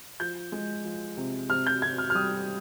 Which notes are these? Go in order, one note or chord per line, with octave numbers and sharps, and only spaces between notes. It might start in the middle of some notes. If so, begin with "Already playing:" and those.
F3 G6
G#3
F3
C3
C3 F6
G6
C3 G#6
F6
F6
G3 D#6